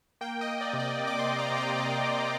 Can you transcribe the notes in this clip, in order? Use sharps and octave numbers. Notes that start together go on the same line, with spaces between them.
A#3 G5
D#5
A#3
D5
C3
D5
C3
D6
C6
C3
A#5
C3
G5
C3 D#5
C3